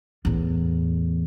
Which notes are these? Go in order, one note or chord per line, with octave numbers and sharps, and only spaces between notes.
E2 A2